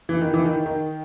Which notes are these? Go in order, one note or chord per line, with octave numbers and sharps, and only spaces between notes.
E3
D#3
E3
D#3
D#3